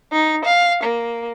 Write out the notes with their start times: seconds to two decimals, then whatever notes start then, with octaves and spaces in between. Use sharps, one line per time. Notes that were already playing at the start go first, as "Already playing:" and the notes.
0.12 D#4
0.44 F5
0.82 A#3